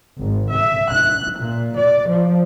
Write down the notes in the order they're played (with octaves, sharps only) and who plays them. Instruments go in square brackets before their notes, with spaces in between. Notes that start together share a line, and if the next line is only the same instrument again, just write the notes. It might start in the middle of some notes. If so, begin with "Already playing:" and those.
[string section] G#1
E5
F#6
A#2
D5
F3